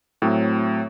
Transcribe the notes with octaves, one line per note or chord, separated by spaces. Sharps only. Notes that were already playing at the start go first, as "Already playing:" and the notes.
A2 F#3 A3 C4